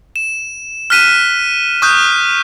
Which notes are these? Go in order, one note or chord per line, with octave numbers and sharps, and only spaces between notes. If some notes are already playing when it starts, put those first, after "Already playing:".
E7
F6 F#6 B6 D#7 E7
C#6 D#6 F#6 G6